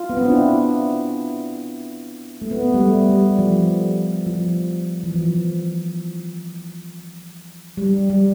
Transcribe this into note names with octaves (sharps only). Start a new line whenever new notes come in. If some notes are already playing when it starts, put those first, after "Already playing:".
Already playing: F4
B3
C4
D4
E4
A3
B3
G3
A3
G3
F3
F3
E3
F3
G3
G3